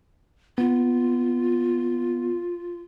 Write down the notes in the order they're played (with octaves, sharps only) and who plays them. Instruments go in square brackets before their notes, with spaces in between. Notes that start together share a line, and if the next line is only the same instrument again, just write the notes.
[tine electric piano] B3 [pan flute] F4